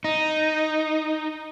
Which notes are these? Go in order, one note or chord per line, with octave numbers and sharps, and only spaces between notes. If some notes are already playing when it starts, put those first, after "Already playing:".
D#4